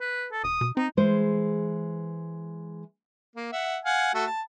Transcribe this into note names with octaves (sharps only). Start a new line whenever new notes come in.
B4
A4
E1 D#6
B2
C4 D#4
E3 G#3 G#4 C5
A#3
E5 F#5
F5 F#5 G#5
A3 F#4 A4
A5